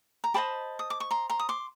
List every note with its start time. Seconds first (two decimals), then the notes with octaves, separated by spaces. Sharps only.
0.24 A#5
0.34 G4 C5 D#5 A5 B5
0.79 D#6
0.90 D6
1.00 C#6
1.11 A#5 C6
1.30 A#5 C6
1.39 D#6
1.49 C6 D6